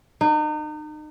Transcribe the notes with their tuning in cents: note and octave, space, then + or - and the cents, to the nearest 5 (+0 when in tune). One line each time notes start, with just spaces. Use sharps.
D#4 -35